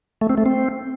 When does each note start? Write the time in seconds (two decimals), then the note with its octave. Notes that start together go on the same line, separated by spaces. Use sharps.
0.21 A3
0.29 C4
0.37 A3
0.46 C4